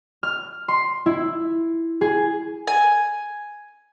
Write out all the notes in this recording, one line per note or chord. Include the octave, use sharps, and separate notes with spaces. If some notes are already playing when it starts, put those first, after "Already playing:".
F6
C6
E4
G#4
G#5